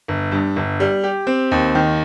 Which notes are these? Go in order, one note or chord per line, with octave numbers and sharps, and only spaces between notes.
G1
G2
G1
G3
G4
C4
D#2
D#3